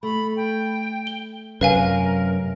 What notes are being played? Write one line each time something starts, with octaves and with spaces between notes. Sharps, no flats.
A3 B5
G5
G7
F#2 C3 A#4 B4 F5 G#5